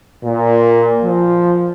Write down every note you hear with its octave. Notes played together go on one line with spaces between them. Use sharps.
A#2
F3